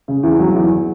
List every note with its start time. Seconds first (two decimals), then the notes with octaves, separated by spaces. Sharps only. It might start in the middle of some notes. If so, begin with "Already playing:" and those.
0.08 C#3
0.23 E2
0.39 F#3
0.55 E2